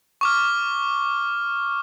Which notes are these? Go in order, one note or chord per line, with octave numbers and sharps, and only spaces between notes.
C#6 D6 F6